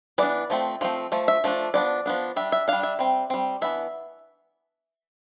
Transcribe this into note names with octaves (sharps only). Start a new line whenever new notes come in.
E3 B3 D4 D5
F3 A3 C4
F3 A3 C4
F3 A3
E5
F3 A3 D4
F3 B3 D4 D5
F3 B3 D4
G3 D4 E5
E5
G3 D4 F5
E5
G3 C4
G3 C4
E3 B3 D4 E5